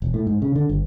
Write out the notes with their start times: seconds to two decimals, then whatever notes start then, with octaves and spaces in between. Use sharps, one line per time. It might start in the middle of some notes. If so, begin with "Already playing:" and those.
0.02 E1
0.14 A2
0.27 G#2
0.42 C#3
0.55 D3
0.69 G1